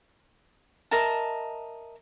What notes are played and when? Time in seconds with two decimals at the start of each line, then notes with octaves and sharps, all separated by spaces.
0.91 A#4 D#5 E5 A5